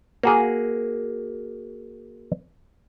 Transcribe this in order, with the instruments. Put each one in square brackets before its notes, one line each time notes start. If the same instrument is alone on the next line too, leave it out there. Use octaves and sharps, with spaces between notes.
[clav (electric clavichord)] A#3 F#4 G#4